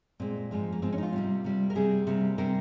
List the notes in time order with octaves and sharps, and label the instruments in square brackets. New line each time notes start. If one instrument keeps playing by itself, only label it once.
[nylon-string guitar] A#2 G#3 C4
G#2 F3 G#3
A#3
G#2 F3 G#3 C4
C#4
D#4
F4
C3 G3 A#3
C3 G3 A#3
A#4
C3 G3 A#3 G#4
C3 G3 A#3
C3 G3 A#3 A#4